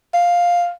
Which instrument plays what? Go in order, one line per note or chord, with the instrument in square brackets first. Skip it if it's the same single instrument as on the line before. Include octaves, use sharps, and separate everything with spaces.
[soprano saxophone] F5